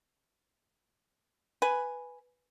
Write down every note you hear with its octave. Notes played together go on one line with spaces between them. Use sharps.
B4 G#5